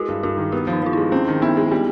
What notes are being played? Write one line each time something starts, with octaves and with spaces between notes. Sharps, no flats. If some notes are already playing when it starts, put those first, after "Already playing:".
Already playing: G#3 E4 F#4 G4
G2
G2 F#4
D#3
B3 G4
F3
D#4
F3 F4
G#3 E4
C4 C#4
D#3
B3 E4
G#3
G3 B3